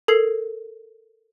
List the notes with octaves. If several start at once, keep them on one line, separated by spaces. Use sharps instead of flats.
A4 A#4 G#6 C7